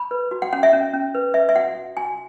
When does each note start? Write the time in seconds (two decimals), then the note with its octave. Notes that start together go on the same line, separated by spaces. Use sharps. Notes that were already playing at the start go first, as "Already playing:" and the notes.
Already playing: B5
0.11 B4
0.31 F#4
0.42 F#5
0.53 C#4 F#5
0.63 E5
0.73 C#4
0.94 C#4
1.15 B4
1.34 B4 E5
1.49 E5
1.55 F#4 F#5
1.75 F#4
1.97 F#4 G#5